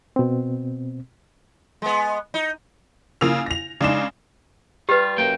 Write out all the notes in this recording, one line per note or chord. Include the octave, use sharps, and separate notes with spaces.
B2 C4
G#3 B3
D#4
C#3 A#3 F4 E6 F7
A#6 F7
C#3 G#3 D4 D#4 D6 E7
G3 F4 G4 B4
F#2 A#3 G5